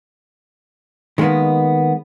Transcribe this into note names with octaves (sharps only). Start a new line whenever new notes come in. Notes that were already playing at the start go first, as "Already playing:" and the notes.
D#3 G#3 A#3 B3